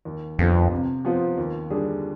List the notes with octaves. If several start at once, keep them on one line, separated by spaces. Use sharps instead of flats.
D#2
F2 D3 F3 B3
C3
F3 B3 F4 C5
D#2
D3 G3 D4 G#4